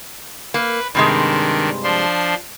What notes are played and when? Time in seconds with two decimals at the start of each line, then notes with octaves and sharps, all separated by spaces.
0.54 A#3 B4
0.95 G2 C3 D#3 G#3 D4
1.83 F3 D4 C6